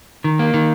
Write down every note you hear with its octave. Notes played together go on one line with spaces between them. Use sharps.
D#3
A#3
D#3